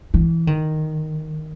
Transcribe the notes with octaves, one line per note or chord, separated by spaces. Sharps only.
E3
D#3